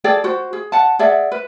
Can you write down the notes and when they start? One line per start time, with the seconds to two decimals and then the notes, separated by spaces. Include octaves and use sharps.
0.04 G#4 A4 D5 G5
0.24 F#4 C5
0.53 G#4
0.72 F#5 A5
0.99 G#4 D5 E5 F#5
1.32 B4